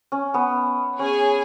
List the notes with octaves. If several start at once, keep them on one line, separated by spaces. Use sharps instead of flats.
C#4
B3
C#4 G#4 C#5 G#5